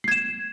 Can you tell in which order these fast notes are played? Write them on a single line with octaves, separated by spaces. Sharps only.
C7 G#6 E7